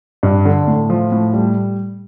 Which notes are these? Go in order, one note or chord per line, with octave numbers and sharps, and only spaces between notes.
G2
D3
A2
F3
A2
G3